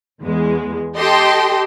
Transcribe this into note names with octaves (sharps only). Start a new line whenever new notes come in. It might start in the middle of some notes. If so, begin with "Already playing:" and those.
E2 G#3
G4 A4 D#5 G5 C6